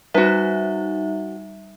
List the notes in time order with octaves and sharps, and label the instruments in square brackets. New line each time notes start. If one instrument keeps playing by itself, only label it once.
[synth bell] G3 D#4 E5 [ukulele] F#4 B4